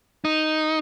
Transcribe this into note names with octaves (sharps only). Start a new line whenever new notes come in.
D#4